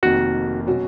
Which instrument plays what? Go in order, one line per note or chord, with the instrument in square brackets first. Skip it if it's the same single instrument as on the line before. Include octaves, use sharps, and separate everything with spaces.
[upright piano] F1 F2 D#3 A#3 [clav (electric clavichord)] F#4
[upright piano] B2 F#3 C#4 F#4